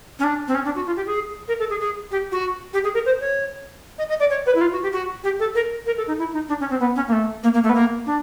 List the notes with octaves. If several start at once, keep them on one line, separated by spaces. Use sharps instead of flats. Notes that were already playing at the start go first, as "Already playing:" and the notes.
C#4
D4
C4
C#4
D4
F#4
F4
G4
G#4
A#4
A4
G#4
G#4
G4
F#4
G4
G#4
A#4
C5
C#5
D#5
D#5
D5
C#5
B4
E4
F4
F#4
G4
F#4
G4
A4
A#4
A#4
A4
D#4
E4
D#4
D4
C#4
C4
B3
C#4
A#3
A3
A#3
A#3
A3
B3
A#3
D4